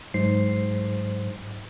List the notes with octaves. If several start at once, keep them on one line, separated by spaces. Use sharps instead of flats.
G#2 F#3 C5 C7